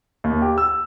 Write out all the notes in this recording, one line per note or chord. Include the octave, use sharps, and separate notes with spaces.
D#2
G4
E6